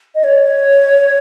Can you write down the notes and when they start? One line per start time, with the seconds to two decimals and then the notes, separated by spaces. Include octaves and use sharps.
0.15 D#5
0.24 C#5